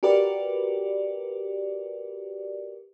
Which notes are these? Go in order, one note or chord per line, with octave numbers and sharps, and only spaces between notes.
F#4 G4 A#4 B4 D5